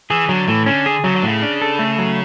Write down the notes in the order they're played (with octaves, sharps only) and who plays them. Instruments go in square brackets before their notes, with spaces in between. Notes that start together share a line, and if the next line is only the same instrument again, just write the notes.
[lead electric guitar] E3 [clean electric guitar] G#4
[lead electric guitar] D3 [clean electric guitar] F#3
[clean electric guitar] A2 [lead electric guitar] E3
[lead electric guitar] D3 [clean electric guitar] C#4
[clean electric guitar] G#4
[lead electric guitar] C#3 [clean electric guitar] F#3
[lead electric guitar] D3
[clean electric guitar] A2
[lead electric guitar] C#3
[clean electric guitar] D4
A4
A3
F#3